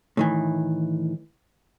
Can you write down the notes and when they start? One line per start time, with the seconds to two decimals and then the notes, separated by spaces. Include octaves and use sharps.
0.17 A2 D#3 E3